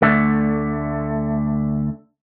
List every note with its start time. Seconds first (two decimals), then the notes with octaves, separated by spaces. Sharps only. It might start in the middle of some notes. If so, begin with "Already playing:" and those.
0.02 D2 G2 D3 A3